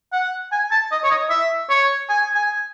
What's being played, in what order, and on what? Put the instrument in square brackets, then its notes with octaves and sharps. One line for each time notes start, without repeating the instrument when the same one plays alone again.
[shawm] F#5
G#5
A5
D#5
C#5
D#5
E5
C#5
G#5
G#5